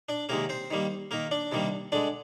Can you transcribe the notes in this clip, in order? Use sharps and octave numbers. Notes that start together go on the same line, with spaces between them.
D4 D5
C3 D#3 G#3 A#3 A#4
C4 C5
D#3 G3 A#3
D#3 A#3 A#4
D4 D5
C3 D#3 G3 A#3
D3 G#3 D4 D5